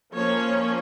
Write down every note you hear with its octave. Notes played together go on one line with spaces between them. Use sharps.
F3 A#3 C#4 C#5